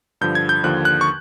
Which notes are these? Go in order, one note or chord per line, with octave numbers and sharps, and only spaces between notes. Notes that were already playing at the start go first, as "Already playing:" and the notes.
G2 D3 F3 G6
G#6
G6
D#2 D3 F3 F#6
F#6
C#6